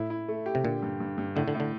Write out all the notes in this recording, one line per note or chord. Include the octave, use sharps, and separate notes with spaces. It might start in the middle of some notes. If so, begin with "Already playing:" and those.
Already playing: A2 E4
E4
A3
G4
C3
A#2 D3
G2
G2
G2
A2 D3
D3
A2
D3